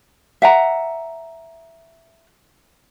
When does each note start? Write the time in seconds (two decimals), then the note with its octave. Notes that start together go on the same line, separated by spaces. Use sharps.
0.42 E5 F#5 A#5